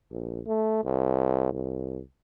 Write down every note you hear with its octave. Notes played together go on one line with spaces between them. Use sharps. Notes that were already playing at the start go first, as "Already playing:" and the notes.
A#1
A3
C2
C2